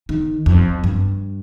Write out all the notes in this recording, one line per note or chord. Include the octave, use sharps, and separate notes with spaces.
D#3
F2
G2